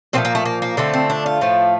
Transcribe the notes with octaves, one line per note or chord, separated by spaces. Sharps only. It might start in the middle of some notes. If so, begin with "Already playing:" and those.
A#2 F3 A3 C4
A#3
A3
A#3
A#3
D3 F3 A3 C4
C4
D4
F4
A2 F3 A3